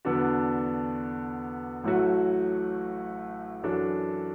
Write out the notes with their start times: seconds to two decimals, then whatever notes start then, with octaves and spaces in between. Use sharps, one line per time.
0.05 E2 D3 B3 D4 F#4
1.84 A1 A2 F#3 A3 F#4
3.63 F#2 E3 D4 F#4 A4